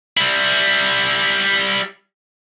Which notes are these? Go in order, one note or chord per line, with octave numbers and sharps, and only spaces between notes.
G3 E4